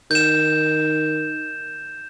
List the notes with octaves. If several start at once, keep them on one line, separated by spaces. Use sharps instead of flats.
D#3 G6 E7